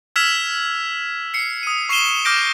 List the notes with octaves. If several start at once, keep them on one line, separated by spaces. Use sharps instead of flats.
E6 F6 G#6 B6 E7 F7
C7 C#7
D#6 D#7
C#6 C7 D#7 E7 G7
D6 F6 G6 A#6 D7